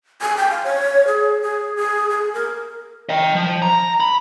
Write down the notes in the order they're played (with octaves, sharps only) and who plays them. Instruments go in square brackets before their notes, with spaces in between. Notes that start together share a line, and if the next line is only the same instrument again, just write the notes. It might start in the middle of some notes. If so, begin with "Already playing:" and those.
[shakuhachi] G#5
G5
F5
C#5
G#4
G#4
G#4
G#4
A#4
[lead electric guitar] D#5 G5
F3
A#5
B5